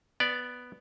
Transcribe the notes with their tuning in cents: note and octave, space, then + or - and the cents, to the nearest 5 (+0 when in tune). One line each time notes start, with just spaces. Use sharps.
B3 +0 D5 +0